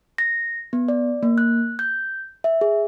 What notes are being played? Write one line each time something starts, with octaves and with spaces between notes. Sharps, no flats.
A#6
B3
D5
A#3
F#6
G6
E5
G#4